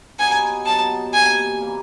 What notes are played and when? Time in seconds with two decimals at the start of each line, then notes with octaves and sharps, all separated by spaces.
0.18 F#3 B3 D#4 G4 G#5
0.66 F#3 B3 D#4 G4 A5
1.13 C3 E3 G3 A#3 G#5
1.61 C3 E3 G3 A#3